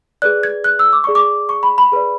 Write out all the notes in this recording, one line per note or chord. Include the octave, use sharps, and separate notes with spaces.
G#4 B4 D5 F#6
G#6
F#6
E6
D6
G#4 D5 C#6
D6
C#6
B5
B5
G#4 B4 D5